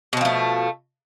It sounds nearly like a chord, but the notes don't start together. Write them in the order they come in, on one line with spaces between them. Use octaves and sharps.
B2 C4 F3 A3